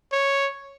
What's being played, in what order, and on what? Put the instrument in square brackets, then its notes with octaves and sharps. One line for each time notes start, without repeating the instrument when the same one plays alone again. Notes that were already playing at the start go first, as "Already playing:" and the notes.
[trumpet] C#5